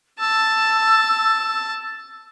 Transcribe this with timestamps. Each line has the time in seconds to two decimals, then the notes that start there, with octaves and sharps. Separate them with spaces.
0.20 A5 E6